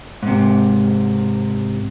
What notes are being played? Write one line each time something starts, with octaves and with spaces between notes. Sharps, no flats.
G#2 C3